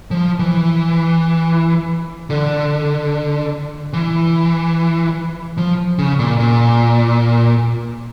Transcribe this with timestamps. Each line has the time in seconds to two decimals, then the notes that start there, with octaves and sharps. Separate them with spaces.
0.11 F3
0.39 E3
2.30 D3
3.93 E3
5.57 F3
5.98 C#3
6.19 A#2
6.39 A#2